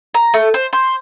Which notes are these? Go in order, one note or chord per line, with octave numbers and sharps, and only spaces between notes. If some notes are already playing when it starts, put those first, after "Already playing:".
A#5
A3
C5
C5